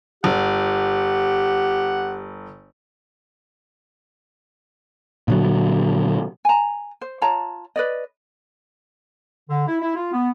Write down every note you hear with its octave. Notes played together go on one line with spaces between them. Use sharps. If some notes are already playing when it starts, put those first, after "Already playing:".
G1 G4 F#5
A#2 D3 F#3
G#5 A#5
C5
F4 C#5 A5 A#5
B4 D5 D#5
D3
E4
E4
F4
B3